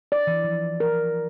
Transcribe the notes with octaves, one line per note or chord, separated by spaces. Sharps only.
D5
E3
F3
A#4